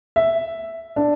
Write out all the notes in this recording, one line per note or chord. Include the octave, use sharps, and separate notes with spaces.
E5
D4